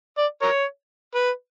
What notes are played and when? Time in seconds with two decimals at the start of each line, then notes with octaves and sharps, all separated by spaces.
0.18 D5
0.42 A#4 C#5
1.15 B4